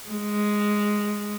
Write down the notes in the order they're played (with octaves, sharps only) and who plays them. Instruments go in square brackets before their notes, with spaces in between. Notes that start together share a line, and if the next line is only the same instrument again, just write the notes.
[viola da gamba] G#3